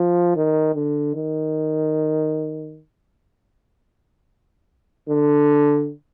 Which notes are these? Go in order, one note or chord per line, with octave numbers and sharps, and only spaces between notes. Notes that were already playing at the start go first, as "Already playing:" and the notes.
Already playing: F3
D#3
D3
D#3
D3